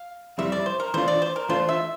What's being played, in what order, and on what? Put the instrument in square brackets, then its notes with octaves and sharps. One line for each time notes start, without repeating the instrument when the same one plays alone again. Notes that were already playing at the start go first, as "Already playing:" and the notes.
Already playing: [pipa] F5
[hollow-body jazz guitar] F2 C3 G3 C4 E4 [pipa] E5
[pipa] D5
C5
A#4
[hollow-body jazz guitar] E3 A3 D4 F4 [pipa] C5
[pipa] D5
C5
A#4
[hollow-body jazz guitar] E3 A3 D4 F4 [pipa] C5
[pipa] E5